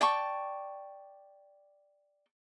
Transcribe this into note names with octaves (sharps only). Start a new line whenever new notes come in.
D5 G5 A5 C#6